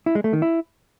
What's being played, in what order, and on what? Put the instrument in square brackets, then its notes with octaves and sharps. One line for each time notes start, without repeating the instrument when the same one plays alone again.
[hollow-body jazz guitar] E4
G#3
A3
D#3
E4